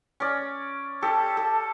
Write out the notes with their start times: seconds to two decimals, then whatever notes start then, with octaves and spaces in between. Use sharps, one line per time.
0.20 C#4 D5
1.02 G4 A4 A5
1.37 A4